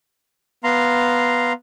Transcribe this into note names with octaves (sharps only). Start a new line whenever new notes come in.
B3 F5 A#5 C6